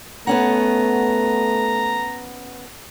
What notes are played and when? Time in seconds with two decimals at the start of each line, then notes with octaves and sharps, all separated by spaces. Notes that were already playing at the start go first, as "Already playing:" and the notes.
0.27 A3 B3 C#4 F#5 A#5